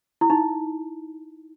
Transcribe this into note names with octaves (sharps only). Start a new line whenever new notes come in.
E4
D#4